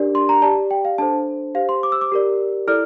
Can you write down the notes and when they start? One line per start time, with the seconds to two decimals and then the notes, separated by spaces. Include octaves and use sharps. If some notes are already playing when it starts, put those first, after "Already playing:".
Already playing: D4 G4 A#4 D5
0.15 C6
0.29 A#5
0.42 G4 D5 A5
0.71 G5
0.85 F5
0.98 D4 A4 C5 A5
1.55 G4 C5 F5
1.69 C6
1.83 D6
1.92 E6
2.01 D6
2.12 G4 A#4 D5
2.67 E4 A4 D5 F6